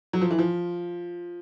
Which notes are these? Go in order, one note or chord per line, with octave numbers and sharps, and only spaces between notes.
F#3
F3
E3
F3